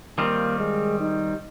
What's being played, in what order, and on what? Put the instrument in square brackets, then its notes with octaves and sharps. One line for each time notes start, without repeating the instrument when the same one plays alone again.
[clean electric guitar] D#3 G3 C4 F4 [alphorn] A#3
[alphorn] G#3
D#4